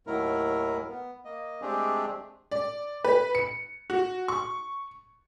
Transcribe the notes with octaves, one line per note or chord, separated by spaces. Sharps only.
D#2 A2 D#3 F#3 E4 A#4
B3
A#3 D#5
G#3 A3 C4 D4 G4 G#4
D5
B4
C#7
F#4
C#6